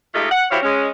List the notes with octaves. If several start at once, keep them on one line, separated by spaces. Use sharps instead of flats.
G#3 A3 D#4 F4 G4 A4
F#5
F#3 E4 G4 C5 C#5 F5
G#3 C#4